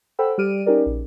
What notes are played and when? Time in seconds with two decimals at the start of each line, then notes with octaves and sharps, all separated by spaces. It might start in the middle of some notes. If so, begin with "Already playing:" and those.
0.19 A4 C5 F#5 G5 B5 E6
0.38 G3 G4 D5 F6 D7 D#7
0.66 C#4 D#4 G4 G#4 A#4 D5
0.86 A#1